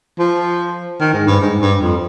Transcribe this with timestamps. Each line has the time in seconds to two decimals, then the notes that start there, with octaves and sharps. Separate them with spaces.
0.19 F3
1.00 D#3
1.14 G#2
1.27 G2
1.41 G#2
1.61 G2
1.81 F2